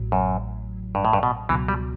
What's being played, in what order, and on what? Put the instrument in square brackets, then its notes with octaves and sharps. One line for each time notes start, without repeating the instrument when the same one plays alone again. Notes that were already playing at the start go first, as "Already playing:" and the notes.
Already playing: [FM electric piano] A1 A2 F#3
[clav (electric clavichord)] F#2
G2
A2
G2
B2
[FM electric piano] C#2 B2 F#3 [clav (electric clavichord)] E3
[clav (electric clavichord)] G3